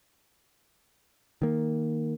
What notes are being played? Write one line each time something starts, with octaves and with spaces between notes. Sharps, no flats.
D#3 A#3